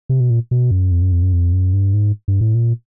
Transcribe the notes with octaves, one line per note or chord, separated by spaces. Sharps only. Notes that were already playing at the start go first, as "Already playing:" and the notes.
C3
B2
A#2
B2
F#2
F2
F#2
F2
F#2
F2
F#2
G2
G#2
G2
A2
A#2